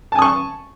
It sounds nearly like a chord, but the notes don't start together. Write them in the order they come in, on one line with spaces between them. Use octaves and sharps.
A5 G#5 D#6 C#6